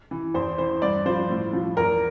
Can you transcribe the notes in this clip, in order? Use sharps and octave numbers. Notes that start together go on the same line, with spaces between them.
E3
E2 C5
E3 C5
G2 D5
F3 C5
A2
F3
E2 A#4